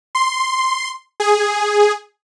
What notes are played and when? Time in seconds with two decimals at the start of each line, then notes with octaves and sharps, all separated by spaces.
0.15 C6
1.20 G#4